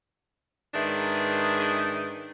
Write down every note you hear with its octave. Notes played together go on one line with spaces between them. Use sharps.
G#2 D#3 D4 G#4 B4 E5